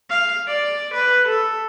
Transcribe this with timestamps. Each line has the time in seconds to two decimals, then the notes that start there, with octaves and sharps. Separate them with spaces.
0.10 F5
0.47 D5
0.94 B4
1.28 A4